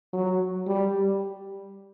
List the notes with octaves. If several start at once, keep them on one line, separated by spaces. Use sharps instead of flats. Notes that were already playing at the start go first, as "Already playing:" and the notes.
F#3
G3